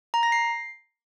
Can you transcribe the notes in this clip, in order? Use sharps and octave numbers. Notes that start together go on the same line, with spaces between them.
A#5
A#6
C7